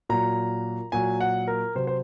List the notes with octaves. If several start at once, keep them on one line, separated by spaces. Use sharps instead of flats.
A#2 F#3 A#5
A#2 F#3 G#5
F#5
A#4
C3 F#3 C5
C5